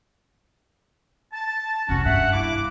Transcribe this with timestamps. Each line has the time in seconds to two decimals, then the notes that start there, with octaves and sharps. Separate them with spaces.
1.33 A5
1.89 C2 F#2 C#4 F#4
2.05 G2 E5 F#5
2.33 A#3 E4 D6